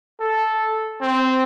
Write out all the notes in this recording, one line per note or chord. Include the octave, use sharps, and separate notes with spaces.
A4
C4